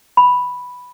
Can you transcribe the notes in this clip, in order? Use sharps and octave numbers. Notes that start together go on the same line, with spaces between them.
B5